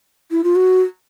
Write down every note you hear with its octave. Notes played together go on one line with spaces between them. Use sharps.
E4
F4
F#4